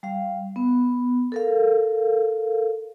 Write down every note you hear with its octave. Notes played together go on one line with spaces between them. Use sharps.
G3 F5
B3
A4 A#4 F5